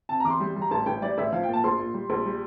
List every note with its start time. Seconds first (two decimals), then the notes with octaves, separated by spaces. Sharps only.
0.09 C3 A5
0.20 E2 A#5 D6
0.30 C6
0.40 G3
0.56 G3
0.62 A#5
0.71 A1 A5
0.86 A1 G5
1.02 G3 D5
1.18 A1 E5
1.32 F3 F5
1.43 G5
1.49 A#2 A5
1.64 A#1 C6
1.79 A#2
1.94 G3
2.10 A#1
2.25 G3